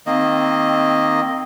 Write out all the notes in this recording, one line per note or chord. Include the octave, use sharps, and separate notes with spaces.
D#3 A#3 C4 D#5